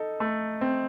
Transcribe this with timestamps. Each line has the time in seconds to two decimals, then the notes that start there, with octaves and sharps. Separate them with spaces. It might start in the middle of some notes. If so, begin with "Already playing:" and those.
Already playing: D#4 A4
0.20 A3
0.61 C4